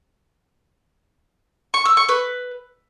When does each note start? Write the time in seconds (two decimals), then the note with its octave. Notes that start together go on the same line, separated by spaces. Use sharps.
1.74 C#6
1.85 E6
1.97 C#6
2.09 B4